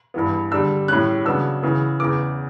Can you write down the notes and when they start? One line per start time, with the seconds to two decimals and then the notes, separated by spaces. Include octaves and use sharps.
0.14 G2 E3 B3
0.52 D3 G3 D4 E6
0.88 A2 G3 C#4 F#6
1.25 C#3 F#3 B3 D4 E6
1.63 C#3 E3 B3
2.00 E2 C#3 E3 D6